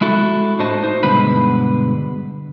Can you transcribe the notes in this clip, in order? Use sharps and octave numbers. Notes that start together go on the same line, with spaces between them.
G#3 E4 F#4 A4
A2 D4 F#4 C5 D#5 A5
D#4 C5
G2 B2 D3 G#3 B4 B5